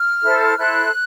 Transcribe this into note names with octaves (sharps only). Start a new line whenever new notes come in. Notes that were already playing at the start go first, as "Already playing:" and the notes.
Already playing: F6
E4 A4 C5
E4 A4 C5 F#6